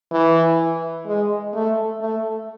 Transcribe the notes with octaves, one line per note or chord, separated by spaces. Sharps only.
E3
G#3
A3
A3